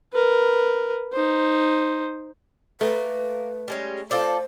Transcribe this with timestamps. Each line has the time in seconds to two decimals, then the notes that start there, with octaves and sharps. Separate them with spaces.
0.13 A#4 B4
1.13 D#4 C5
2.81 A3 A#3 B4
3.68 G3 G#3 C#4
4.11 F4 A4 C5 D5